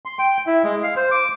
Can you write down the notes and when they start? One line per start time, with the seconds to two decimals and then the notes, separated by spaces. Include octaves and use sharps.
0.06 C6
0.19 G5
0.47 E4
0.64 G#3
0.83 F5
0.97 C5
1.11 D6